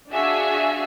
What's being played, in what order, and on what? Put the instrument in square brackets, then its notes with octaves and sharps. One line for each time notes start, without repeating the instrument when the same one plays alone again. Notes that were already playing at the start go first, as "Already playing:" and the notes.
[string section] D4 F#4 G#4 E5 F5 G#5